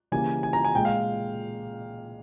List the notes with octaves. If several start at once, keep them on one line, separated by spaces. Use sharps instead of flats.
C#3 E3 G3 A#3 G#5
G#5
A#5
G#5
A#2 G#3 G5
F5